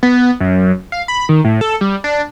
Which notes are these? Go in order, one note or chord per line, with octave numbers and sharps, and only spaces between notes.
B3
F#2
F5
B5
D#3
A2
A4
G3
D4